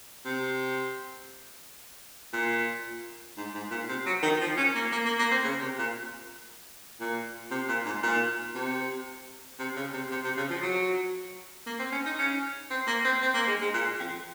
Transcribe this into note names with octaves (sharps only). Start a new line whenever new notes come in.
C3
A#2
G#2
G#2
A#2
C3
F#3
D#3
F3
C#4
A#3
A#3
A#3
A#3
C4
C#3
C3
A#2
A#2
C3
A#2
G#2
A#2
C3
C3
C#3
C3
C3
C3
C#3
F3
F#3
A#3
C4
C#4
D#4
C#4
C4
A#3
C4
C4
A#3
G#3
G#3
A#2
F2